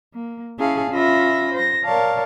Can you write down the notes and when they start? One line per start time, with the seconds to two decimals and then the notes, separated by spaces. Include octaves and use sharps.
0.14 A#3
0.59 C#4 E4 G#4 C#5 F5 A5
0.91 C#4 F4 E5 B5 A#6
1.53 C5 A#6
1.84 A#4 C#5 D5 F5 A5